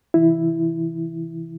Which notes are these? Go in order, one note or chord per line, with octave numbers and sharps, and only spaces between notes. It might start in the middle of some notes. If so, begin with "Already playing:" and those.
C3 E3 E4